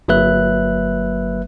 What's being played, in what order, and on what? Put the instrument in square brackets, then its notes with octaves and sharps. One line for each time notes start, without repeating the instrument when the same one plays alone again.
[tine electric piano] G1 F#3 A#3 B4 E5 F#6